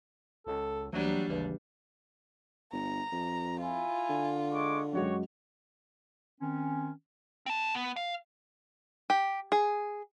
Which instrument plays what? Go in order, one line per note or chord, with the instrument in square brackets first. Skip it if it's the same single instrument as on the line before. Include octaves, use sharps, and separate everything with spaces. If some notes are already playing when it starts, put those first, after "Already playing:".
[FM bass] C#2 [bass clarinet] A4
[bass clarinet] D2 [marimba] E3 A#3 [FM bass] F#3 [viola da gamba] G3 D4
[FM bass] G#1 [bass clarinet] D#2 [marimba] C#3 E3 B4
[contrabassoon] G1 [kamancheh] A#5
[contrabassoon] F2
[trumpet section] E4 G#5 [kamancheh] F4
[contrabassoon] D3
[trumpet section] G#3 C#6 D6
[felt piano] F#2 F#3 G#3 [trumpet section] F#4 G4 C#5
[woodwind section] D#3 C4 C#4
[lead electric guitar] C4 A5
B3
F5
[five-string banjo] G4
G#4